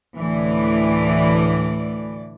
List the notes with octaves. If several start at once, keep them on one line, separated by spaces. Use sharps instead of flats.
D2 A2 E3 D5